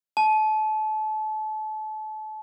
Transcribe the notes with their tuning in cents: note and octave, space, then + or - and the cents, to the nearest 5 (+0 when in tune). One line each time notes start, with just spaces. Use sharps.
A5 -30